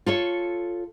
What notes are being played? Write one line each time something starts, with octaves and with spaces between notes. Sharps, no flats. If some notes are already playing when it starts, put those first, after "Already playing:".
F4 A4 C#5